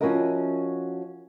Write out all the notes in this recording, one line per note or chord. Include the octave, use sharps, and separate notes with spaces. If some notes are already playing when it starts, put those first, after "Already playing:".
F3 C#4 E4 F#4 A#4 D#5